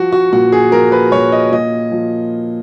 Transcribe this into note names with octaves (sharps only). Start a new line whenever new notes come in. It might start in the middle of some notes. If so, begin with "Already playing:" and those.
Already playing: F3 F#4
F#4
A#2 F#4
G#4
F3 A#4
B4
A#2 C#5
D#5
A#2 D#5
F3